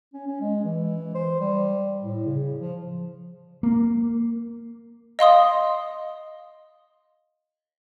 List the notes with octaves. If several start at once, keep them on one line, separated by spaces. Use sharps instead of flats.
C#4
C#4
G#3
E3
C5
G3
A2
C#3
F3
A#3
D#5 F5 C6 D#6